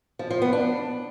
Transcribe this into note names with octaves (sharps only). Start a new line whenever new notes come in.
F3
F3
B3
D4